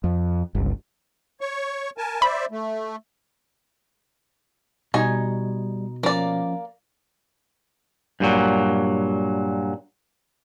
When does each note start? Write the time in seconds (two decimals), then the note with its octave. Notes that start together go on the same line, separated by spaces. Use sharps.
0.04 F2
0.55 G1 C#2
1.41 C#5 C#6
1.98 A#4 G#5 A5
2.22 C5 D5 E5 B5
2.51 A3
4.94 B2 G3 D#4 G#5
6.03 F3 A#3 C#4 D5
8.20 G2 A#2 F#3